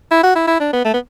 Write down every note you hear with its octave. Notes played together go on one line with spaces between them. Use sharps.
E4
F#4
E4
E4
D4
B3
A3
B3